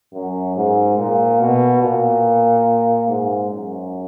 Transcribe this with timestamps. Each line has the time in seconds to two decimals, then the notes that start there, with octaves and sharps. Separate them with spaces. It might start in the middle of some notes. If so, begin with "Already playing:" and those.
0.14 F#2
0.56 G#2
0.98 A#2
1.41 B2
1.82 A#2
3.08 G#2
3.50 F#2